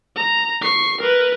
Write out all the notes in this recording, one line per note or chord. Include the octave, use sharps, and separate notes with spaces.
A#5
C#6 C7
A#4 B4